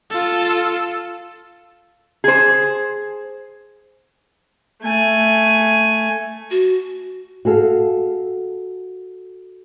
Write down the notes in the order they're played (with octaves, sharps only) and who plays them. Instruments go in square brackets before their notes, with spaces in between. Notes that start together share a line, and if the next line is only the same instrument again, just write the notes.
[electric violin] F4 A4
[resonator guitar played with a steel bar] G#4 C5
[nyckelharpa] A3 G#5
[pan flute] F#4
[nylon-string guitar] F#4 G#4 A4 F5